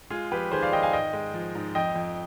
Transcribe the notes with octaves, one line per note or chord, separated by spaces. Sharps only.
G#3 F4 G#4
F2 G4 B4
D#3 G#4 C5
D5 F5
D#3 D#5 G5
F5 G#5
G#2 D#5 G5
G#3
F3
G#2
F2 D#5 G5
F2